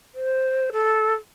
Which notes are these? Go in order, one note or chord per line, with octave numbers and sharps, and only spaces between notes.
C5
A4